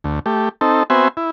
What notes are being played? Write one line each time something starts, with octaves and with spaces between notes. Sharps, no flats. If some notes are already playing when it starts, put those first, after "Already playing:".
D2
A3 G4
C4 D#4 A4
B3 C4 F#4 C5 E5 G#5
E4